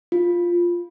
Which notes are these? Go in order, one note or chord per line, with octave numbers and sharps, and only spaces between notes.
F4